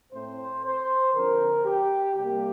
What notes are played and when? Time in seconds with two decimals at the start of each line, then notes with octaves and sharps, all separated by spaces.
0.13 A2 A3 C4 C5
0.64 C5
1.14 D3 F3 C4 A#4
1.65 G4
2.16 C3 G3 A#3 G4